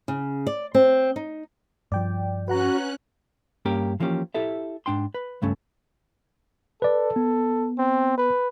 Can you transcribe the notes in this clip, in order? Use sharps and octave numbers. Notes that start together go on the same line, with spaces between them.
C#3
D5
C4
D#4
G2 F3 D5 G5
C#4 F#4 B4 F#5 A#5 F#6
G2 A#3 C#4 G4 A#4
E3 F3 A#3 C#4 G4
E4 G4 A4 E5
G#2 D4 G5 C6
B4
C#2 G2 A3 C#4
A4 B4 D5
B3
C4
B4